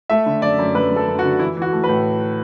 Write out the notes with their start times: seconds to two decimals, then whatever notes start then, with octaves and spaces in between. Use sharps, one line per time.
0.10 A3 E5
0.26 D3
0.42 F#2 D5
0.58 F#2
0.75 F#2 B4
0.91 F#2 A4
1.08 F#2
1.19 F#4
1.24 D3
1.39 E3 E4
1.57 E3 F#4
1.73 A3
1.84 B4
1.89 A2